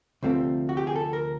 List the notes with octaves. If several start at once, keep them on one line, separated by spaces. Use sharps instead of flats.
D2 C3 F3 A3 C4
F#4
G4
G#4
A4
A#4